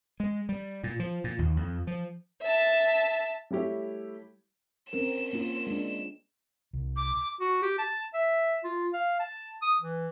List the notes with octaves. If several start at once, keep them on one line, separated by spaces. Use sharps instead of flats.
G#3
G3
A#2
F3
A#2
D#2
F2
F3
E5 A5
G3 A3 E4 G4 C#5
C4 C#4 A#4 E7
A#3 C#4 F4
G#3 D4
C2
D6
F#4
G4
A5
E5
F4
F5
A5
D#6
E3